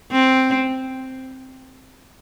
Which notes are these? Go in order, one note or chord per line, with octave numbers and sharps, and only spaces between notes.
C4